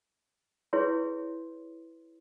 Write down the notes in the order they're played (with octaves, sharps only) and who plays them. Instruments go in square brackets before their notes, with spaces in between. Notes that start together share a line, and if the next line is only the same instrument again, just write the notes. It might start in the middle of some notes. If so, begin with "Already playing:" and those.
[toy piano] E4 G#4 B4 C#5 C6